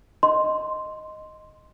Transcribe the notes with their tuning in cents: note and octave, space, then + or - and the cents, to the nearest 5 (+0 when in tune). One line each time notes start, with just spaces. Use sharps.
D#5 +0 C6 +0